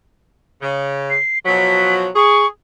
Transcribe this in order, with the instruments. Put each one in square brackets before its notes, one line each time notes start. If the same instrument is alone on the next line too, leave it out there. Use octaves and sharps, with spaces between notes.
[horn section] C#3
[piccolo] C7
[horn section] B2 F3 F#3 [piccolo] B6
[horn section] G#4 [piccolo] C#6